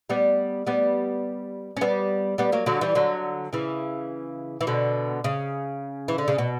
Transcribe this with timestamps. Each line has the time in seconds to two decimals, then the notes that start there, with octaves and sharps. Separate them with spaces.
0.10 G3 B3
0.67 G3 B3
1.77 C#4
1.81 G3 B3
2.38 G3 B3
2.52 F#3 A#3
2.66 D3 F#3
2.81 E3 G3
2.95 D3 F#3
3.53 C#3 E3
4.61 E3
4.67 B2 D3
5.24 C#3
6.08 E3
6.18 D3
6.28 C#3
6.38 B2